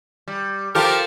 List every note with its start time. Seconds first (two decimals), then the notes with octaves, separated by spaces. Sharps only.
0.28 G3
0.75 F3 F4 G4 A4 A#4